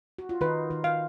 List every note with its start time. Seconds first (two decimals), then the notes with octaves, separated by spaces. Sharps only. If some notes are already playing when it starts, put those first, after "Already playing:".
0.18 F#4
0.29 F4
0.41 D#3 D#4 B4
0.70 D#3 D#4
0.84 F5